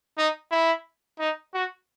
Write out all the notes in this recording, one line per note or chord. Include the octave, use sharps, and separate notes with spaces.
D#4
E4
D#4
F#4